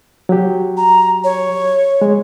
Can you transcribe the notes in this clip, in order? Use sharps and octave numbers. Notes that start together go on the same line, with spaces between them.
F#3 G4
A#5
C#5
G#3